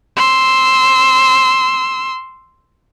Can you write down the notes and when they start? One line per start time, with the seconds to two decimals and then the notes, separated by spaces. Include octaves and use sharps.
0.16 C6 E6